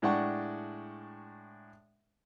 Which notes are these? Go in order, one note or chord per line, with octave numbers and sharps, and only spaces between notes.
A2 G#3 D4 F#5 G5 C#6